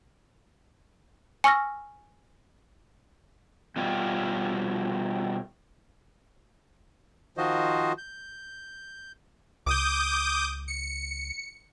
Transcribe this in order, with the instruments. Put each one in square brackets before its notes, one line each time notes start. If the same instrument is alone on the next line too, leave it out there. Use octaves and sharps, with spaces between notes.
[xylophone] G#5 C#6 E6 F6 A#6
[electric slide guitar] B2 G3 F4
[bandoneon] D#3 F3 F4 F#4 C5 D#5
G6
[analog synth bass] C#2 [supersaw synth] D6 D#6 G6
[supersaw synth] C#7